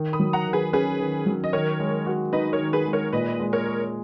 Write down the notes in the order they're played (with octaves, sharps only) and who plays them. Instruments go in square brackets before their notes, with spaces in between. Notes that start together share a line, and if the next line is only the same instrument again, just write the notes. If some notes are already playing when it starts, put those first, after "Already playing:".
Already playing: [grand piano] D#3
[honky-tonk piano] B5 D#6
[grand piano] F#3
[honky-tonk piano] F#5 A#5
[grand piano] D#3
[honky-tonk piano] G#4 B4
[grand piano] C#4 [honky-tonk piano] G#4 B4
[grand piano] D#3
F#3
[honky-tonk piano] D#5
[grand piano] D#3 [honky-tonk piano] A#4 C#5
[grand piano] G#3
F#4
[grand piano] D#4 [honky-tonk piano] B4 D#5
[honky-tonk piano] A#4 C#5
[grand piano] D#3
[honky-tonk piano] G#4 B4
[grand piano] G#3
[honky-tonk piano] A#4 C#5
[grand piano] A#2 [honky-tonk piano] B4 D#5
[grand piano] G#3
[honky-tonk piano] A#4 C#5
[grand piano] G#4